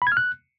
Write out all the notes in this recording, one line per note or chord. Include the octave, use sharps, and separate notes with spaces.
B5
G#6
F6
F#6